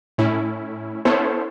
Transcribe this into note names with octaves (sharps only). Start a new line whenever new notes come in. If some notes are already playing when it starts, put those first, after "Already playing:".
A2 C#4 E4
B3 C#4 E4 A4 C5 C#5